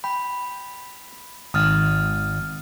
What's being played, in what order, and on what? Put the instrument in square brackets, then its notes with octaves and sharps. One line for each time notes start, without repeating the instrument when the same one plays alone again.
[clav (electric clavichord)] G5 [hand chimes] B5
[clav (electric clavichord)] G#1 [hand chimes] D#6 F6 A6